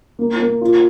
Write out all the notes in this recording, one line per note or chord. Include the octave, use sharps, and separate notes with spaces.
A#3
A#3
F4